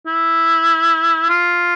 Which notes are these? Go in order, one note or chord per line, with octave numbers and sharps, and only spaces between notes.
E4
F4